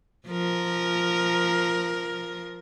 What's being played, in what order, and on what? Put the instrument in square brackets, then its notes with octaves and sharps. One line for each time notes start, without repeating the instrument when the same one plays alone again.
[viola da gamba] F3 A#4